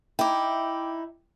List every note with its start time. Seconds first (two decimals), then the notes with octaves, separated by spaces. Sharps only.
0.19 D#4 E4 G5 D6